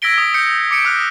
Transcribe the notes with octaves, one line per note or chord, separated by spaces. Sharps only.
E6 G#6 A#6 B6 D7 G7
D#6 G7
D#6 G6 C#7 D7
D6 C#7 D7
D#6 F6 F#6